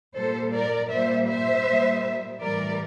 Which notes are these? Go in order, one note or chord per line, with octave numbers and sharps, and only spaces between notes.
A#2 G3 A4 C5
A#4 D5
A#2 G3 C5 E5
C5 E5
A#2 G3
A2 E3 G3 A#4 D5